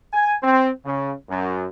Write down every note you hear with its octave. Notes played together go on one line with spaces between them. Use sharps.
G#5
C4
C#3
F#2